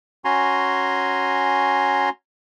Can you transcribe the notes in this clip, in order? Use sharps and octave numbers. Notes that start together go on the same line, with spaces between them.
C#4 F#4 G#5 A#5 C6